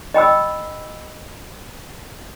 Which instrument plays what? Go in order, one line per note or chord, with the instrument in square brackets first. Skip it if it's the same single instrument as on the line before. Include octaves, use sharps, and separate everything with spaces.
[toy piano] D#5 G5 B5 E6